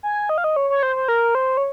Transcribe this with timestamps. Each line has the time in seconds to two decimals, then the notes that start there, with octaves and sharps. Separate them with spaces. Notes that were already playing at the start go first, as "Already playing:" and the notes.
0.03 G#5
0.29 D#5
0.38 F5
0.44 D#5
0.56 C#5
0.70 C#5
0.83 C5
0.96 C5
1.08 A#4
1.35 C5
1.57 C#5